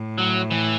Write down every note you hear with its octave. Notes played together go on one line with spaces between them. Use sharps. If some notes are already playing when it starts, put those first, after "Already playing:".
Already playing: A2
F#3
E3